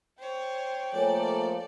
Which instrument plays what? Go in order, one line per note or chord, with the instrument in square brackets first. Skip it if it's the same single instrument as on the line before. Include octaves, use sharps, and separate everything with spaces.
[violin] C5 C#5 [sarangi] G5
[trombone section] F3 A3 A#3 [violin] A4 D5 [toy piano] C#5 G#5